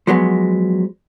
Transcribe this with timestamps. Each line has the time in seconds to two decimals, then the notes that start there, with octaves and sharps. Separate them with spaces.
0.07 F3 F#3 G#3 B3